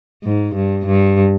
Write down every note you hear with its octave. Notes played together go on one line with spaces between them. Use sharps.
G#2
G2
G2